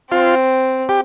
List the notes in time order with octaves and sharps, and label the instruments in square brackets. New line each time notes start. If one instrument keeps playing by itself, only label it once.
[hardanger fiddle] C4 [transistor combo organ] F4
[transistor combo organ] G4